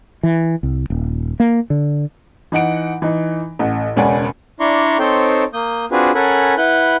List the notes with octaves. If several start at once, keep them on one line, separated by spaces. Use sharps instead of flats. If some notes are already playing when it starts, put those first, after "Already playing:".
E3
C2
D#1
A#3
D3
E3 D#4 F#5 D7
E3 D#4
A1 F#5
E1 C#2 C#4 D5 F#5 G#5
D4 E4 D5 A#5 C6 C#6
C4 D#4 A4 C5 C#5 G5
A#3 D#6 G6
C4 D4 F4 F#4 G#4 B4
C#4 A4 A#4 F#5 G#5 B5
E4 B4 F#5 F#6 G6